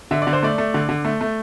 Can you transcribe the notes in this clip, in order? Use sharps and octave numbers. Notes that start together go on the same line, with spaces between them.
D3 E5
D5
D3
C5
A3 D5
A3
D3
D3
A3
A3